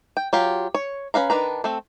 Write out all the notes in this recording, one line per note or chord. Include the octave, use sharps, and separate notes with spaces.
G5
F#3 F4 G4
C#5
C#4 B4 F5 A#5
D#3 D4 B4 A#5
A3 C4